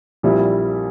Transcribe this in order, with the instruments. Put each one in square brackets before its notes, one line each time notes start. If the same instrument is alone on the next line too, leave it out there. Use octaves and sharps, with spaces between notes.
[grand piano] A#1 A#2 G3 C4 E4